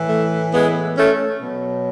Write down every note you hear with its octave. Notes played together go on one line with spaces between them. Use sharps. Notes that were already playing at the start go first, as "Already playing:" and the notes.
Already playing: A2 E3
A3
G#3 B3
A3 C#4
B2 F#3